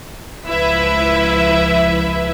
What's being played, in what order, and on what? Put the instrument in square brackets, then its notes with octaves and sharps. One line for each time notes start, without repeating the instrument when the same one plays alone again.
[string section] C#2 F3 E4 B4 E5